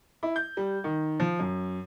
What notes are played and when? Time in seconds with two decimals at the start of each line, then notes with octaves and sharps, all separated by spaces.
0.23 E4
0.36 G6
0.57 G3
0.84 D#3
1.20 F3
1.39 F#2